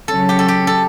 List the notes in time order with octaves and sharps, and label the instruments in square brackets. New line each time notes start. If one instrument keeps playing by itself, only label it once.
[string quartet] C#3 F#3 C#4 [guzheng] A4
[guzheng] G4
A4
G4
A4